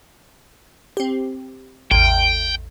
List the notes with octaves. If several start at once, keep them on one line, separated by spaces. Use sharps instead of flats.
C4 G4
A1 E2 G5